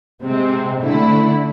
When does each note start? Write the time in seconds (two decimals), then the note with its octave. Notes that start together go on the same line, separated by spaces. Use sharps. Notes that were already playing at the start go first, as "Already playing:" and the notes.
0.23 C3 G#3 C4
0.81 D3 A3 E4